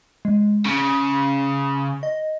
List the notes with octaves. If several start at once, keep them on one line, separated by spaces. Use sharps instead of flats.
G#3
C#3 C6
D#5